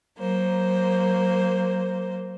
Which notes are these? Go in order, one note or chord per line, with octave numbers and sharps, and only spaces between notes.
F#3 A#3 C5